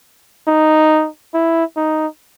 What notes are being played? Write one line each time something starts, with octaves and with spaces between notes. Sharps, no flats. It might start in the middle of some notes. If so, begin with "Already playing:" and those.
D#4
E4
D#4